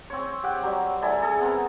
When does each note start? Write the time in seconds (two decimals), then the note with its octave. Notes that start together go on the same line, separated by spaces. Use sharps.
0.10 C4 C#5
0.43 G4 F#5 G5
0.63 F#3 G3
1.01 G3 E4 A4 G#5
1.22 G#4 A4
1.41 B3 C4 A#4